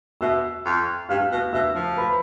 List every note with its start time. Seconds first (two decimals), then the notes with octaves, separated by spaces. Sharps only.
0.21 B2 E5 E6
0.65 F2
1.09 G2 F5 F6
1.32 B2
1.53 B2 E5 E6
1.75 F3
1.97 B4 B5